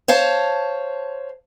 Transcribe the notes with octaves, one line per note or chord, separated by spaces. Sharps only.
C5 C#5 F5 A5